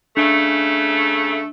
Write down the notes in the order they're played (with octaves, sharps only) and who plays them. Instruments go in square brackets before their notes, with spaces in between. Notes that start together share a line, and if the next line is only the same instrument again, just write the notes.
[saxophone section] C#3 A3 [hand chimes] D4